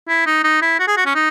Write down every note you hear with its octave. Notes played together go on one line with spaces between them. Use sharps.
E4
D#4
D#4
E4
F#4
G#4
F#4
C#4
D#4